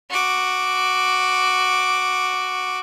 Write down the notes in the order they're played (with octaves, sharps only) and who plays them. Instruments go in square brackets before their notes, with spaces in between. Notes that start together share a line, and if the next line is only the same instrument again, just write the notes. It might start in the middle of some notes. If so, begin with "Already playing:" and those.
[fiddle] F#4 D6